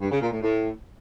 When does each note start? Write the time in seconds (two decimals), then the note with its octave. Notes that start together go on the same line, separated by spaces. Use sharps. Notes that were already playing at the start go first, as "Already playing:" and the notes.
0.01 G2
0.11 C#3
0.21 A#2
0.32 A2
0.42 A2